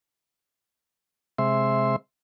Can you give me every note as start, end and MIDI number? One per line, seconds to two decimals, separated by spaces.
1.39 1.96 48
1.39 1.96 56
1.39 1.96 76
1.39 1.96 84